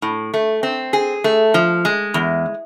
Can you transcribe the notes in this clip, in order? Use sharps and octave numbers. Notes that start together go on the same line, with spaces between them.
A2
A3
C4
G#4
A3
F3
G#3
E2